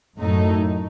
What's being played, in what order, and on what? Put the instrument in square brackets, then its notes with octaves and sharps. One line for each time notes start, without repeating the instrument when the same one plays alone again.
[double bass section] F#2 [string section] A2 F#3 A3 D#4